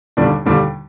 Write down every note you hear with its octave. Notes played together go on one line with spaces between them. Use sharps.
D#2 D3 G3 D4
D#2 D3 G3 D4